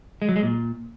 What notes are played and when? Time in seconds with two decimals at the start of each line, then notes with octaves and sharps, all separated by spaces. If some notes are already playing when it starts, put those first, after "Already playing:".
0.22 G#3
0.29 F#3
0.36 G#3
0.43 A#2